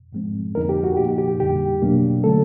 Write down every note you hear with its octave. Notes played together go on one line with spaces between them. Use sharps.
G#2 F3 G#3 C4
F2 D3 F3 A#3 D#4 A#4
G4
F#4
A#2 F3 A#3 D#4 G4
G4
F2 D3 G3 G4
B2 F#3 A#3 D4
D3 F#3 A3 C#4 A4